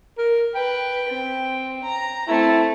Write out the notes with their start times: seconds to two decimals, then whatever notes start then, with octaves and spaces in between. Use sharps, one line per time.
0.18 A#4
0.55 B4 G5
1.09 C4
1.84 A#5
2.28 A3 C4 E4